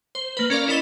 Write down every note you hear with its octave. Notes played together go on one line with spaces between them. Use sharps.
C5
A#3 B4
C#4 A#4 D5 F5
E4 A#4 D#5 B5 A6 G7